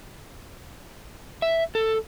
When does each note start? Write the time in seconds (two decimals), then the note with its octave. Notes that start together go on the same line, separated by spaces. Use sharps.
1.42 E5
1.75 A4